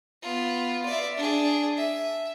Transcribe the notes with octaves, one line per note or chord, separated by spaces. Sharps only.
B3 F4
D5 E5
D4 G#4
E5